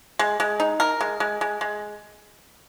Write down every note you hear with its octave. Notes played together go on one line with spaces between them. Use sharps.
G#3
G#3
D#4
A#4
G#3
G#3
G#3
G#3